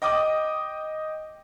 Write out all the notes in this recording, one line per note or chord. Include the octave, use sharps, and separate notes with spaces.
D#5 G5 D6 D#6